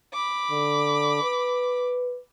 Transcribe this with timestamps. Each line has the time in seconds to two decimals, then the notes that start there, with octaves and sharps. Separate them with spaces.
0.13 B5 D6
0.51 D3
1.23 B4